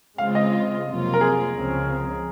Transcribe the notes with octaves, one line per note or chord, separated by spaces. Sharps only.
C#3 G#3 C4 F4 F5
D#5
F2 C3 F#3 A#3 F4
A#4
G#4
C#2 C#3 F3 C4